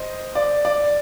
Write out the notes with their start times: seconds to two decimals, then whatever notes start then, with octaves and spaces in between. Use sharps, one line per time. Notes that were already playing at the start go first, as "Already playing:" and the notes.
Already playing: C5 D#5
0.35 D5
0.65 D5